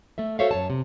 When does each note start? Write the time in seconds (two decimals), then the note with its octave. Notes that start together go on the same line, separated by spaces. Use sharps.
0.18 A3 A4 E5
0.39 F#4 A4 C5 C#5 E5 F5
0.51 F#2 C#5 A5
0.70 C3